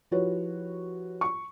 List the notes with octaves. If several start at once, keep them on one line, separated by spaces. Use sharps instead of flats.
F3 E4 F#4 G4 B4 C#5
C#6